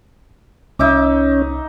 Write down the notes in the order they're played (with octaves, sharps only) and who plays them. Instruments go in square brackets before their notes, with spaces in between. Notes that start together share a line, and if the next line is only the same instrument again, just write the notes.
[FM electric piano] C2 [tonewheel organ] C#4 [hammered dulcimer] D#4 E5 D6